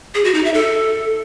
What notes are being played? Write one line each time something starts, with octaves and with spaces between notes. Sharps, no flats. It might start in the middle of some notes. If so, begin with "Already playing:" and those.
G#4
F#4
D#4
E5
A4